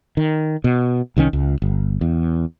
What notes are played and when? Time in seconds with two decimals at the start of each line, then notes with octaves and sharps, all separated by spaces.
0.17 D#3
0.64 B2
1.16 C2 D#3 E3 C#4
1.33 C#2
1.62 G1
2.01 E2